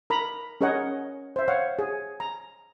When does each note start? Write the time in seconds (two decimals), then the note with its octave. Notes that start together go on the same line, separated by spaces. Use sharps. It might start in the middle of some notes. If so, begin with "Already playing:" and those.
0.10 A#4 A#5 B5
0.61 C#4 G#4 A#4 C#5 D#5 F#5
1.36 C5 E5
1.48 C#5 F5 F#5
1.79 G#4
2.20 A#5